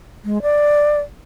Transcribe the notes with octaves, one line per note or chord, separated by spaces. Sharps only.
G#3
D5